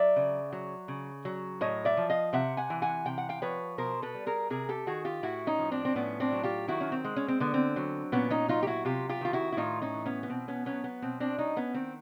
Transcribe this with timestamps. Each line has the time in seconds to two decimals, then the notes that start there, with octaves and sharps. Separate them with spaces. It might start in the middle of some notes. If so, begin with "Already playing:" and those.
Already playing: F#3 D5 E5
0.16 C#3
0.53 F#3
0.88 C#3
1.25 F#3
1.61 A2 C#5 D#5
1.85 D5 E5
1.97 F3
2.10 D#5 F5
2.33 C3 E5 F#5
2.57 F#5 G#5
2.70 E3
2.82 F#5 G#5
3.05 C3 G5
3.18 F#5
3.29 F5 G5
3.42 F3 B4 C#5
3.78 B2 A#4 C5
4.02 A4 B4
4.15 G3
4.26 G#4 A#4
4.50 C3 G#4 A#4
4.69 G4 A4
4.87 D#3 F#4 G#4
5.05 F4 G4
5.23 A2 E4 F#4
5.47 C#4 D#4
5.59 F3
5.71 C4 D4
5.85 C4
5.96 A2 B3 C#4
6.20 C4 D4
6.32 F#3
6.43 F4 G4
6.68 D#3 E4 F#4
6.81 C#4
6.92 C4
7.05 G#3
7.16 C#4
7.28 C4
7.40 D3 B3
7.54 C4
7.76 F#3
8.12 A#2 B3 C#4
8.30 C#4 D#4
8.49 F#3 D#4 F4
8.63 G4
8.67 E4 F#4
8.85 C3 F4 G4
9.09 F4 G4
9.21 D#3 F4
9.33 E4 F#4
9.52 E4
9.57 A2 D#4 F4
9.82 C#4 D#4
9.94 E3
10.06 B3 C#4
10.23 B3
10.30 B2 C4
10.48 B3 C#4
10.66 F#3 B3 C#4
10.84 B3
11.02 B2 C4
11.20 C4 D4
11.38 G3 C#4 D#4
11.56 B3 C#4
11.74 D#3 C4